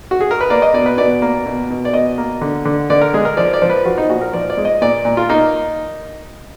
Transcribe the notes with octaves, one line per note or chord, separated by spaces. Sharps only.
F#4
G#4
A#4
B4
A#3 D5
D#5
B2 D5
B4
B2 D5
A#3
B2
B2
D5
B2 D#5
A#3
D3
D3
D3 D5
A#4
G#3 G#4
A#4
F3 D5
D5
F3
B4
F3 F#4
D#4
A#2 F#4
A#4
F3 D5
D5
G#3
D#5
A#2 D5
A#2
F4
A#3 D#4